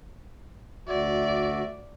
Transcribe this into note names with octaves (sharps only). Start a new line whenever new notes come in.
D2 F#4 D5 E5